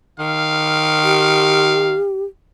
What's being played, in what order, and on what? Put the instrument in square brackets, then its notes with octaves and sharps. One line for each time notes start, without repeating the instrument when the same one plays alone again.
[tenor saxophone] D#3 [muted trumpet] F5
[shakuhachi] G4